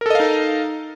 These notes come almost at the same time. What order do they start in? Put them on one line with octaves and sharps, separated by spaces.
A#4 A4 D#5 F5 D#4